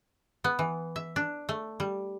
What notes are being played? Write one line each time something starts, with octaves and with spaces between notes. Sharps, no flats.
B3
E3
E5
D4
A3
G3